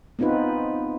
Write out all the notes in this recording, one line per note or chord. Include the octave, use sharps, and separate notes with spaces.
B3 C4 D#4 F4 B4